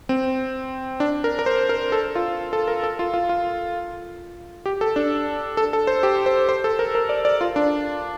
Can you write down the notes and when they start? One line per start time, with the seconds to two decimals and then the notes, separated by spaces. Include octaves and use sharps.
0.09 C4
1.00 D4
1.24 A#4
1.39 A#4
1.46 C5
1.69 A#4
1.92 A4
2.15 F4
2.53 A4
2.68 A#4
2.84 A4
2.99 F4
3.14 F4
3.29 F4
4.66 G4
4.81 A4
4.96 D4
5.57 A4
5.73 A4
5.87 C5
6.03 G4
6.26 C5
6.49 C5
6.64 A4
6.79 A#4
6.95 A#4
7.09 D5
7.25 D5
7.41 F4
7.56 D4